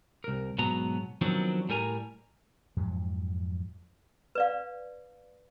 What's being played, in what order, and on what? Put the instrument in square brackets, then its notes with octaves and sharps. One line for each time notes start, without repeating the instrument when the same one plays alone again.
[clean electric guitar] C2 A#4
G#2 B2 F#3 B3 A#5
D#3 F3 F#3 B3 C4 D4
A2 G3 A#4 G#5 A#5
[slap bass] F2 G#2 F3 F#3
[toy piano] B4 D5 F5